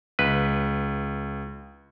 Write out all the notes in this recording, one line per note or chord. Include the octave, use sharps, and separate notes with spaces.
C#2 B4